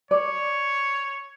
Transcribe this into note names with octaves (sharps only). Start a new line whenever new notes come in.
C#5 D5